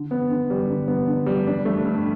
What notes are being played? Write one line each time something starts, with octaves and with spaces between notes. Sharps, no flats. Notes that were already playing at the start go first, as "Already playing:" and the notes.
Already playing: D3
B3
D3
G3
D3
B3
D3
G3
D4
A3
G2